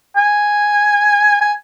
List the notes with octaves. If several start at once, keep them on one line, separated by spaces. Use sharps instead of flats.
G#5
G#5